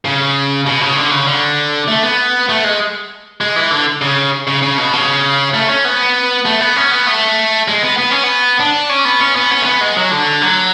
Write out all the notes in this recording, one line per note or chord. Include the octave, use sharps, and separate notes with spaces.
C#3
B2
C#3
D3
C#3
D3
A3
B3
A3
G#3
G#3
E3
D3
C#3
C#3
C#3
B2
C#3
A3
C#4
B3
A3
B3
C#4
B3
A3
G#3
B3
B3
C#4
B3
D4
C#4
B3
C#4
B3
C#4
A3
B3
G#3
F#3
D3
F#3